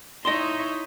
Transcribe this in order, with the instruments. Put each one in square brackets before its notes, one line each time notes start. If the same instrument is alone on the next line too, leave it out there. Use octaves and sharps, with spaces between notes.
[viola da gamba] D#4 E4 C#5 [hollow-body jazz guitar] D#5 A5 C6